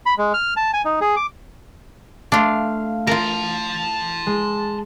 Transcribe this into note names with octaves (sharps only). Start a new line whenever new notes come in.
B5
G#3
F6
A5
G#5
D#4
G#4
D6
A3 D4 F4 F5
F4 A#4 A5 C6
G#3